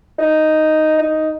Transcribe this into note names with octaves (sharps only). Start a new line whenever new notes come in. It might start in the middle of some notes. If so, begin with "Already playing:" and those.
D#4
D#4